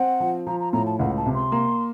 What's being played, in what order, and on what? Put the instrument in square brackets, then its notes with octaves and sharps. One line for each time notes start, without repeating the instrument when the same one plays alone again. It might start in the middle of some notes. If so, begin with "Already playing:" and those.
Already playing: [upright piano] C4 [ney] F#5
[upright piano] F3
[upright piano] F3 [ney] A#5
[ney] A#5
[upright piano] A2 [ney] A#5
[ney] A5
[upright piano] C#2 [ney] F#5
[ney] A5
[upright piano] C3
[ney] C6
[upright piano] A#3